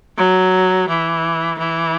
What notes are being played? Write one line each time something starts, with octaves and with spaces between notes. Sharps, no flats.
F#3
E3
E3